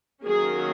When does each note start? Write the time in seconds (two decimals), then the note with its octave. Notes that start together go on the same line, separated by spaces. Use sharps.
0.24 D#3 F#3 A#3 C#4 G#4